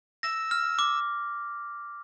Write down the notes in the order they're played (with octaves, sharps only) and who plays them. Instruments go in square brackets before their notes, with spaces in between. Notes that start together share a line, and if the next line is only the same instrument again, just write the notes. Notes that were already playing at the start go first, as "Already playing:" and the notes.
[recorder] E6 [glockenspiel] A#6
[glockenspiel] F6
D6